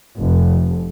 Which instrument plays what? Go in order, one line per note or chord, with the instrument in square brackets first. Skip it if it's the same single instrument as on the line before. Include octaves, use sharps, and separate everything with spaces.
[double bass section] F1